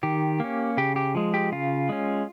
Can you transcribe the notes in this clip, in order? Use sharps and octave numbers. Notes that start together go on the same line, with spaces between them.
D#3 G4
A#3 C#4
C#3 G4
G4
F3 G#3
G4
C#3 F4
G#3 C#4